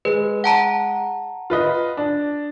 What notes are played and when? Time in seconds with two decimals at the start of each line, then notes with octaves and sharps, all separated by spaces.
0.05 G#3 B4
0.44 F#5 A5 A#5
1.50 F4 B4 D#5
1.97 D4